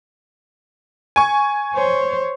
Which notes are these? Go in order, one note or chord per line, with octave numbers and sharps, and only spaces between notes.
G#5 C#6
C5 C#5